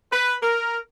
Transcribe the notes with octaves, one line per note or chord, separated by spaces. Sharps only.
B4
A#4